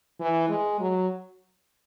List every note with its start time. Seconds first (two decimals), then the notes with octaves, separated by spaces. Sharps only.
0.20 E3
0.49 G#3
0.80 F#3